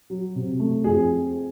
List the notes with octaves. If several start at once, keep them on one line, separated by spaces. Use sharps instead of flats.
F#3
C3
A3
F2 G#4